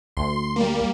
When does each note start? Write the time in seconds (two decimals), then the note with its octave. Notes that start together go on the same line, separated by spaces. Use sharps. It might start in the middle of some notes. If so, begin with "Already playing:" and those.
0.17 D2 C6
0.56 G3 A#3